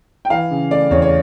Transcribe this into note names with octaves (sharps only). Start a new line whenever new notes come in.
G5
E3 F5
C#3
A3 D5
E2 C#5
C#5